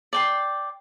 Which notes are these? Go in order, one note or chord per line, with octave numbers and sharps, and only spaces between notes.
D5 G5 C6